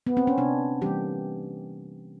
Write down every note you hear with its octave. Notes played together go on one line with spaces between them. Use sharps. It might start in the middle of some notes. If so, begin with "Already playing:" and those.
B3
C4
C#4
C3 D4
E3 G3 A#3 G4